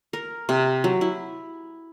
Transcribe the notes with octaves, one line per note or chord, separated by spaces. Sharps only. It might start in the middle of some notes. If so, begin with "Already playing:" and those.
A#4
C3
F#3
E4